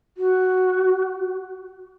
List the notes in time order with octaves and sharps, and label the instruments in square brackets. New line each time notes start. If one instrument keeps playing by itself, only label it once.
[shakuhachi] F#4